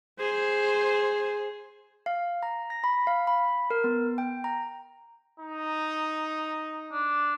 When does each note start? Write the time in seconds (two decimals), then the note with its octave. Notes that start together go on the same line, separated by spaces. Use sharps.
0.19 G#4 C5
2.06 F5
2.43 A#5
2.70 A#6
2.84 B5
3.07 F5
3.27 B5
3.70 A#4
3.84 B3
4.18 G5
4.44 A#5
5.40 D#4
6.92 D4